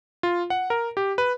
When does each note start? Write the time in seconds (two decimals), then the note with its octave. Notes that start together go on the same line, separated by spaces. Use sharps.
0.23 F4
0.50 F#5
0.70 A#4
0.97 G4
1.18 B4